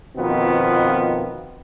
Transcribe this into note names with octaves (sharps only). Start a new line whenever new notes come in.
F2 B2 D#3 B3 C4 F4